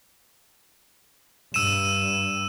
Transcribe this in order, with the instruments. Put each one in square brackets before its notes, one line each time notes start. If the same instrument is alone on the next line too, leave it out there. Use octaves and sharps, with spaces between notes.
[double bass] G2 [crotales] E6 D#7 E7